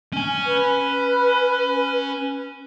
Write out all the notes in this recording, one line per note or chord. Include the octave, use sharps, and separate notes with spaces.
C#4 G#5
B4